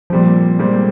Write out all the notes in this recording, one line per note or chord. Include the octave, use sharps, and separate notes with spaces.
A#2 F3 G3 C4
A#2 G3 G#3 C4